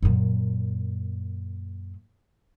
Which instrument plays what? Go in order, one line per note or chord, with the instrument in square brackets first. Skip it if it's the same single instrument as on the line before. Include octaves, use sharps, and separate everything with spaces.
[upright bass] F#2 A#2